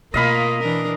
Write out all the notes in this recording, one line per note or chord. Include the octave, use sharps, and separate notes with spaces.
B2 A3 A#3 F4 A#4 D#5 F5 B5
E3 D4 A#4